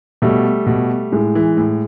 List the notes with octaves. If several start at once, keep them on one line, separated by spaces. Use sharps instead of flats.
B2 G3 A3
B2
A2 G#3
E3
A2